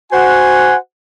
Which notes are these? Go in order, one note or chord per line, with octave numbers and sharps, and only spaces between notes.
F#4 C5 F#5 G#5